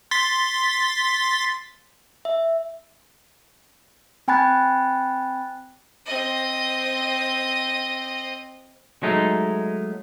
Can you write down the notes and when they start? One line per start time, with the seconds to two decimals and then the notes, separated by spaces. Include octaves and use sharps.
0.11 C6 A6 B6
2.25 E5
4.28 C4 G5 G#5 B5 F#6 A6
6.06 C4 D#5
9.03 F#3 G#3 A3 D#4